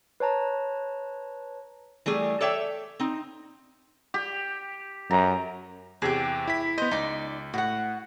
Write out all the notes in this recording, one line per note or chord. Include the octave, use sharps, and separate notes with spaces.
B4 C#5 A5 A#5
E3 G3 A3 G#4
A4 C#5 D5 E5 G5
C4 D#4
G4
F#2 A#5
E2 C3 G4 G#4
E4 B6
B3 C5 D#5
C#2 D#4 D5
A2 F#4 F#5